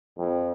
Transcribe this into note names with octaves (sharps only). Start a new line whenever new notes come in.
F2